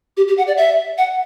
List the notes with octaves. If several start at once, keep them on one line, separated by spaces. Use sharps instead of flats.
G4
G4
F#5
D5
E5
F#5